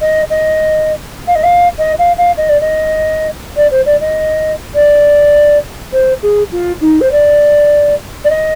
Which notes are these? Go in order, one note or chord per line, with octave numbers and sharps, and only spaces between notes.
D#5
D#5
F5
D#5
F5
D#5
F5
F5
D#5
D5
D#5
D5
C5
D5
D#5
D5
C5
G#4
F4
D#4
C5
D5
D5
D#5